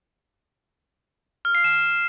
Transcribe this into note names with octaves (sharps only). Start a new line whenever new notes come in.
F6
C7
E7